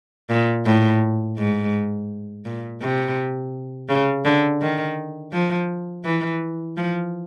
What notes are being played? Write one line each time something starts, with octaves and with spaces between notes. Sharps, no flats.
A#2
A2
G#2
A#2
C3
C#3
D3
D#3
F3
E3
F3